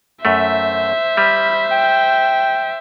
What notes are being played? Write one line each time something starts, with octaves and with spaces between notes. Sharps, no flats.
F#2 A3 C5 E5
G3 B5
G5